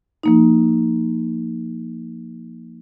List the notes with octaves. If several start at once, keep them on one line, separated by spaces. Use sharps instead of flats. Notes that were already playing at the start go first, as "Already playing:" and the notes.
F3 A#3 D#4